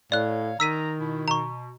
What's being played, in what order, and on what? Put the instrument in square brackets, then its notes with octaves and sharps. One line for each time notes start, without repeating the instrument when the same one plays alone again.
[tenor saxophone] A2 [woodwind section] C#5 F5 [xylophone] D5 F#6
[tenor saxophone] D#3 [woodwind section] A#5 [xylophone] E6 B6 D#7
[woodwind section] B2 E4
[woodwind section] B2 [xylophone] A#5 C#6